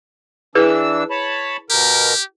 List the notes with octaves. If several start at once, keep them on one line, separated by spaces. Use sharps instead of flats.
E3 D4 E4 G#4 B4 E6
C#5 A5 B5
B2 G4 A#4